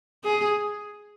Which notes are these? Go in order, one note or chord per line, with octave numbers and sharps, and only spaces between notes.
G#4